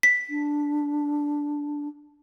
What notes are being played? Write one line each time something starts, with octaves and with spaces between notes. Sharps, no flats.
B6
D4